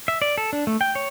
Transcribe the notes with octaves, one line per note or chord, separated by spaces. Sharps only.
E5
D5
A4
D4
A3
G5
C#5